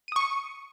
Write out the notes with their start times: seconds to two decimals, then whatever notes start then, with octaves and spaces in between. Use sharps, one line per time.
0.08 D#7
0.12 D#6
0.16 C#6
0.20 C#7